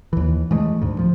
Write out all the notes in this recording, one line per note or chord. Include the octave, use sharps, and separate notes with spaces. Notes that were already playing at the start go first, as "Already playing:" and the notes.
D#2 E3
E3 F3 G#3 A3
D2 G#2
F3